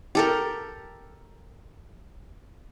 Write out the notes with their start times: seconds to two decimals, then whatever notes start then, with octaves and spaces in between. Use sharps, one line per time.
0.15 G4 A4 A#4